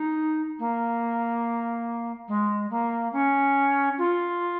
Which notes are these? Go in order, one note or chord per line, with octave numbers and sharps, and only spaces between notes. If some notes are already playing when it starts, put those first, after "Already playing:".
Already playing: D#4
A#3
G#3
A#3
C#4
F4